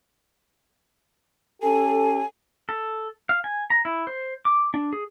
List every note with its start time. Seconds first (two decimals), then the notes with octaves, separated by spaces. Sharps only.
1.63 C#4 G4 A4 G#5
2.69 A4
3.29 F5
3.44 G#5
3.70 A#5
3.85 E4
4.07 C5
4.45 D6
4.74 D4
4.93 G#4